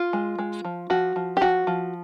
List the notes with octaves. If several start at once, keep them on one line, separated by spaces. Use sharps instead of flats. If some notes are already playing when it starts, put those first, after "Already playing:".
Already playing: F4
G#3
G#3
F3
F3 F#4
F3
G4
F3 F#4
F3